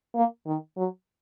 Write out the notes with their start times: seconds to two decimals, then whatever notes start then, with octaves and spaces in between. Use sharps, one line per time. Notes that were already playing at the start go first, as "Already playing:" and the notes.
0.15 A#3
0.46 D#3
0.77 F#3